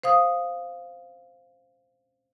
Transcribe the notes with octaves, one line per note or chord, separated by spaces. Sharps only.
C5 F5 D#6